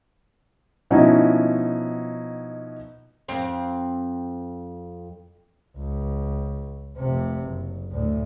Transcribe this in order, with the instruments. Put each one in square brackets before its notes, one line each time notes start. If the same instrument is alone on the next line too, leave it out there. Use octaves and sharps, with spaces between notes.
[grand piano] B2 F3 C#4 D#4 E4 F#4
[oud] F2 C4 F5
[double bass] C#2
F1 C3
F#1
D2 A2